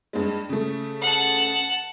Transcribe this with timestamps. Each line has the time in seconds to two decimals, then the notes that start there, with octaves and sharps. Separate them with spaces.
0.13 G2 G#3
0.49 C#3 A3
1.02 F#5 A5